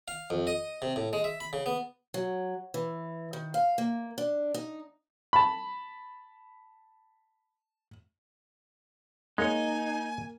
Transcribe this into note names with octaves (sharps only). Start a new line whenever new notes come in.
F5
F2
D#5
C3
A2
G#3
E5
B5
C#3
B3
F#3
E3
D#3
F5
A#3
D4
D#4
A5 B5
G#3 A#3 D#4 C#5 G#5